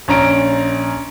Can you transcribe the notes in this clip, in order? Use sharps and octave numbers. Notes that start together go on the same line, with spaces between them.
A#1 C#4 A#5 D7